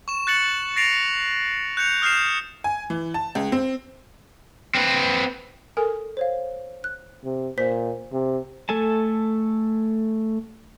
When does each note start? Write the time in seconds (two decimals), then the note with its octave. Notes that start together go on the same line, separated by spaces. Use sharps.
0.08 C#6 E7
0.27 F#6 A6 C#7 F#7
0.76 A6 A#6 C7 D7 F7
1.77 F#6 G6 C#7 F7
2.02 D#6 F6 G6 C7 E7
2.64 G#5
2.90 E3
3.14 A5
3.35 C#2
3.52 C4
4.75 C4 B4
5.77 A4 A#4 G#5
6.17 C5 C#5 F5
6.84 F#6
7.24 C3
7.58 A#2 C5 B6
8.12 C3
8.69 A3 A4 G#5 A5